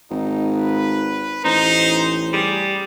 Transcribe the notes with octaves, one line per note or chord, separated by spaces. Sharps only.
G#1 D#4
B4
A1 D#4 C5
G3 G#4